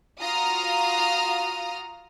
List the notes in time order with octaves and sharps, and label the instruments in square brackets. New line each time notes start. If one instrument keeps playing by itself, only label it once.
[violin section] F4 F#4 A#5 D#6 F6